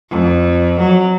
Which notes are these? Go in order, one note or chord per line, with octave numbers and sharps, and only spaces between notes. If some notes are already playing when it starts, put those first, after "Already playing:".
F2
F#3